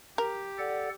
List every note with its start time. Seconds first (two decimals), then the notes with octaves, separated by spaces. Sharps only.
0.18 G4 A#4
0.58 A4 D5 F#5